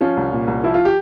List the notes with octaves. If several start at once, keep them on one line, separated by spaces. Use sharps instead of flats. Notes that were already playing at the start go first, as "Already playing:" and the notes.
F3 C#4 F4
C2
A#2
C2
F3 E4
F4
G4